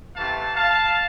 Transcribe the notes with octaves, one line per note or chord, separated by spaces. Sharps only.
C3 E3 A3 F5 A5
F5 A5